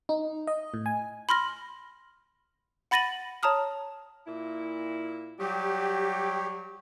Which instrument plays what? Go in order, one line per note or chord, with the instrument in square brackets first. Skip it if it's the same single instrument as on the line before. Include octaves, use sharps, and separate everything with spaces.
[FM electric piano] D#4
D#5
A2
G#5
[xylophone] B5 C6 F6 A#6
F#5 B5 A6 A#6 D#7 F#7
C#5 A5 A#5 D#6 F6
[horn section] A#2 E4
[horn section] F#3 G3 [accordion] G4